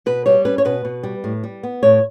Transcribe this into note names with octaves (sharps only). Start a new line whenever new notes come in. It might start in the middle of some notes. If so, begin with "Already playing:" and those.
B2 B4
G3 C#5
C#4 B4
C#5
B2 B4
B2
G3
A2
G3
B3
A2 C#5